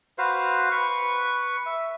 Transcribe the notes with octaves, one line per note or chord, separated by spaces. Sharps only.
F#4 B4 C5 F5
B4 C#6
E5